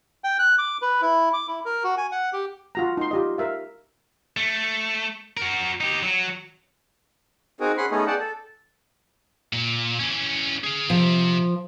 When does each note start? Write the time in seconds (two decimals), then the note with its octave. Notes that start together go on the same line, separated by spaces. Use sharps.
0.24 G5
0.39 F#6
0.58 D6
0.82 B4
1.01 E4
1.33 D6
1.48 E4
1.65 A#4
1.84 F#4
1.98 G#5
2.12 F#5
2.33 G4
2.75 F4 F#4 A#5
2.97 D#4 C6
3.11 F4 G4 D#5
3.38 A#4 E5 F5
4.37 A3
5.37 F#4 A#4
5.81 D#4 G4
6.03 F#3
7.60 C4 D#4 F#4 G#4 A#4
7.77 C#4 G#4 F#5 B5 C6
7.91 A3 B3 C#4 D#4 G#4
8.07 G#4 D5 F#5 G5 A5
8.20 A4
9.53 A#2
9.99 E3 C#4
10.64 G#4 F5
10.90 C3 F3